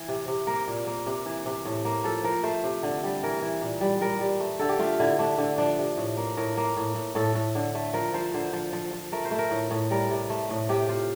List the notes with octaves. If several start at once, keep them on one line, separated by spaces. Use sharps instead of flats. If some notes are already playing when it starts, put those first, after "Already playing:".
Already playing: E3
C3
C3
A#3 A#4
A#2
A#3
C3
E3
C3
A2
A#3
F3 A4
F3 A#4
A3 C5
C3
D3
G3
E3 A#4
E3
A#2
G3
G3 A#4
G3
A3
D3 A4
G4
A3 F4
D3 E4
A3 D4
D3
F3 D4
C3
A2
A#3
A2 A#4
A#3
A2
A2
A2 A4
A2
D3
A3
F3 A#4
F3 C5
D3 C5
F3
F3
F3
A3 A#4
C5
A3
A#4
A2
A2
G3 A#4
C3
A3
A2
C3 G4
C3 F4